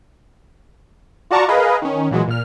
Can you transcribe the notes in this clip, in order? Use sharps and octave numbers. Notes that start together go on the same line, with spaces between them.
F4 F#4 D5 A5 A#5 C#6
G#4 A#4 B4 D#5 F5
D#3 C#4
A#2 E3 F#3 G#3
A#2 F6